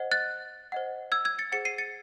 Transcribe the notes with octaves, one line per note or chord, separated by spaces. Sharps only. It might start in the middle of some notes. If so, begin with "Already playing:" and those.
Already playing: C5 D#5 F#5
F#6 A6
C5 D#5 F#5
E6 G#6
E6 G#6
A6 C#7
G#4 C5 F#5 A6 C#7
C7 D#7
A6 C#7